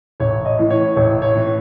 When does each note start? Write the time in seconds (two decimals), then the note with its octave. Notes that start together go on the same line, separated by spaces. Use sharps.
0.20 A1 C#5
0.45 D#5
0.59 A2 E3
0.70 C#5
0.96 A1 C#5
1.22 C#5
1.34 A2 E3